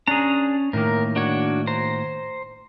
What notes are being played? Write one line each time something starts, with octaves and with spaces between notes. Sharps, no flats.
C#4 D4 G#4 A#5
A2 D#3 A#3 A#4
D4 F#4 C#5
C5 A#5